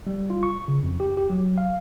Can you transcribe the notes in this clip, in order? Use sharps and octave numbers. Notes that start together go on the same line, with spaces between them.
G3
F4
C#6
C#3
F2
G4
G4
F#3
F5